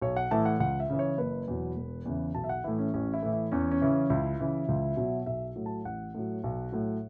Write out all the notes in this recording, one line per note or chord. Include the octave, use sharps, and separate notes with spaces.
B1 C#5
F#5
A2 E3 A5
F#5
C#2 F#5
E5
C#3 E3
C#5
F#1 B4
E2 B2 F#3
E1
E2 C#3 E3
B1 A5
E5
F#5
A2 E3 E4
C#4
A1 C#4
E4
A2 E3
E4
E2 C#4
C#4
C#3 E3
C#4
C#2 E4
C#3 E3
C#2
B2 F#3
B1 E5
A2 F#3
A5
A1 F#5
A2 F#3
B1
A2 F#3